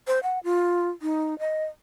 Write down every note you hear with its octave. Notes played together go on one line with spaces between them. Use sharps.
C5
F#5
F4
D#4
D#5